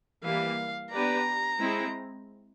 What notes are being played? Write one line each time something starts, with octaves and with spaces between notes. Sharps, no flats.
E3 G3 A#3 F5
B3 D4 G4 B4 D5 A#5
G#3 C4 E4